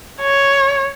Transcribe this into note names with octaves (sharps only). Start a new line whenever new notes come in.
C#5